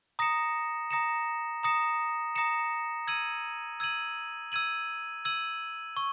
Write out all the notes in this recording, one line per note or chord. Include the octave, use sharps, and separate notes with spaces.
A#5 D#6 A#6 C#7 E7
A#5 D#6 A#6 C#7 E7
A#5 D#6 A#6 C#7 E7
A#5 D#6 A#6 C#7 E7
E6 G#6 D#7 F#7
E6 G#6 D#7 F#7
E6 G#6 D#7 F#7
E6 G#6 D#7 F#7
C#6